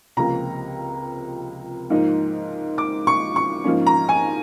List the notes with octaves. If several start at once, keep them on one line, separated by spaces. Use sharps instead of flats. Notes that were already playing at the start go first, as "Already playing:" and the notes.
C#2 C3 F3 A#3 A#5
G#2 F3 A#3 D#4
D6
C#6
C#6
G#2 F3 A#3 C#4
A#5
G#5